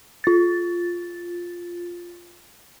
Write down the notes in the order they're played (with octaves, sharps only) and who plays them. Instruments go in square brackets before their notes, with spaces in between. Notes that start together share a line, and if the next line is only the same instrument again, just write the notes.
[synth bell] F4 A6